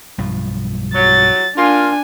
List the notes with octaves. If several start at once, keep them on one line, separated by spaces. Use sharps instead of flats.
B1 G2 F3
F#3 A6
A#3 D4 F4 G#5